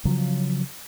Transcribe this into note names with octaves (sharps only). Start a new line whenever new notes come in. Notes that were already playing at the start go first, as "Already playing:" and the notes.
C#3 F3 F#3